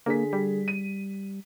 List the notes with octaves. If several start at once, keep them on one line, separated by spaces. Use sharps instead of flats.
D3 A#3 G#4 B6
G3
D#7